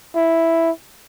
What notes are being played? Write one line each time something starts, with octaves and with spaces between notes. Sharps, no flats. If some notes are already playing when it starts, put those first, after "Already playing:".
E4